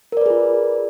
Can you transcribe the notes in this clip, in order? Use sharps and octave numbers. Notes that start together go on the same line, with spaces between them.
F4 G#4 A#4 B4 D5